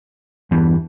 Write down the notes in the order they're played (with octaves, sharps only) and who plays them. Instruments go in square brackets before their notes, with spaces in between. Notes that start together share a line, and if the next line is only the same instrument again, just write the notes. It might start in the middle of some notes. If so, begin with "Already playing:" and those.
[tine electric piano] E2 [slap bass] G2 E3